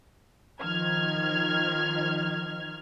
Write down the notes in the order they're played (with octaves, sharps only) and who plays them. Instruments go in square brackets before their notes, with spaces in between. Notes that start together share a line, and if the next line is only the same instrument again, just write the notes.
[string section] D#3 F3 F6 G#6